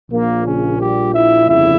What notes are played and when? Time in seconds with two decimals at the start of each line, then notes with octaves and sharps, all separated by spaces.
0.10 A#1 A#2 F3 A#3
0.45 C#3 C#4
0.78 G3 G4
1.13 E4 E5
1.47 G1 F2 C#3 F3 E4 E5